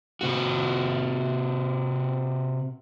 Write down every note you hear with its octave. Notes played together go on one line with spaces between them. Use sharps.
C3 F#4